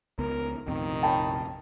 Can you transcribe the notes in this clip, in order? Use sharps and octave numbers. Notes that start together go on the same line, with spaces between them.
C#2 B3 A#4
A#1 F2 C3 D#3
G5 A5 B5